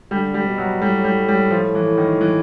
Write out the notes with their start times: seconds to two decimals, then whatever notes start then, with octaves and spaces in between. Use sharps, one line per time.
0.11 D3 G3
0.34 G3
0.46 B2
0.58 F#3
0.81 A2 G3
1.04 G3
1.29 G3
1.51 F3
1.75 E3
1.98 D#3
2.21 E3